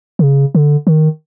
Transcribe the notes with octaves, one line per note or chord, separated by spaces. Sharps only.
D3
C#3
D3
D#3